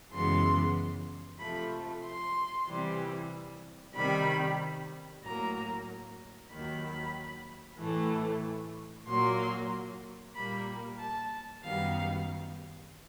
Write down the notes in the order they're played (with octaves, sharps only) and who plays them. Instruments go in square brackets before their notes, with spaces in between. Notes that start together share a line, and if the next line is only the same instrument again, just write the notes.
[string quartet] F#2 C#3 E3 G#3 B3 C6
C3 F3 A3 B5
C6
C3 E3 G3
C3 D#3 G3 B5
A2 F#3 A#3 A#5
D#2 D#3 F#3 B5
A2 E3 A3
A#2 F#3 A#3 C6
A#2 G3 A#3 B5
A5
F#2 D#3 G3 B3 F5